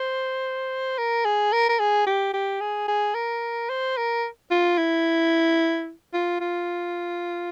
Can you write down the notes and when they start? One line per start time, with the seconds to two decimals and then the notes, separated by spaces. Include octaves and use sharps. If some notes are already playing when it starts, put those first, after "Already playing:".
Already playing: C5
0.98 A#4
1.25 G#4
1.53 A#4
1.69 A#4
1.80 G#4
2.07 G4
2.34 G4
2.61 G#4
2.88 G#4
3.15 A#4
3.70 C5
3.97 A#4
4.51 F4
4.78 E4
6.14 F4
6.41 F4